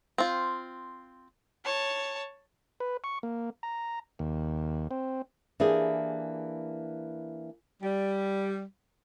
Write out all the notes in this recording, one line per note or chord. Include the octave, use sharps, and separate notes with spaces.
C4 F4
C#5 A5
B4
C#6
A#3
A#5
D#2
C4
E3 A#3 D4 G4 G#4
G3